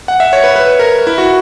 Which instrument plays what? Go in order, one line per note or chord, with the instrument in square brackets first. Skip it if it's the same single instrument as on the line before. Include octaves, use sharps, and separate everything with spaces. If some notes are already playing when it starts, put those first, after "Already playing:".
[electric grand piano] F#5
E5
C#5
B4
B4
A#4
E4
F#4